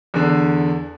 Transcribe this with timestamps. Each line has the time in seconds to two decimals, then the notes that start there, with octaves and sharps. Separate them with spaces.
0.14 E2 D3